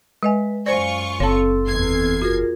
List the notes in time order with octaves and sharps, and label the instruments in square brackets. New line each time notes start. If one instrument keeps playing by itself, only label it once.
[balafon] G#3 D#5 G#5 [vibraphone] B4
[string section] F#2 F4 C#6 [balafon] C5 D5 [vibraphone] G#5
[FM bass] F#1 [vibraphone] C4 A4 E6 [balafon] C#5 A5
[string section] E2 G#6 C7
[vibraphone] F4 G#4 A#4 [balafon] F#4